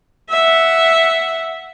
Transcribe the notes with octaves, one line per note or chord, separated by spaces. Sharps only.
E5 F#5